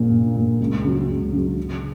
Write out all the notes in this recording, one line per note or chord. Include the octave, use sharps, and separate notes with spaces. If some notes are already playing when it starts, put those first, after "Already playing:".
Already playing: A#1 A#2 A#3
A#1
A#2 A#3
C#2
C#3 F#3
C#2
C#3 F#3
C#3